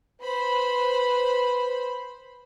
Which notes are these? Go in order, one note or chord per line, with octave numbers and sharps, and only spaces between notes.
B4 C5 B5